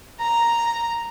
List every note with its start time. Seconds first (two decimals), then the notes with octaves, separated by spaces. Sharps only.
0.21 A#5